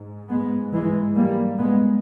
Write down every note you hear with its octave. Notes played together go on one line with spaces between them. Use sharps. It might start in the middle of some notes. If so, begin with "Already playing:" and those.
Already playing: G#2
G#3 B3
E3 G#3
G3 A#3
G#3 B3